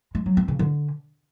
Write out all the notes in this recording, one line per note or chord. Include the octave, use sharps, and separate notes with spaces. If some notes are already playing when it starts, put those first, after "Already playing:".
G#3
F#3
C4
C#3
D3